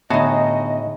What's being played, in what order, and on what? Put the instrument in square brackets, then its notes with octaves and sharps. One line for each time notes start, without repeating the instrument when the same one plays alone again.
[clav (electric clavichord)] A2 F#4 A5 [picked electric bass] D3 B3 [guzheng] D#4 G#4 [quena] D#5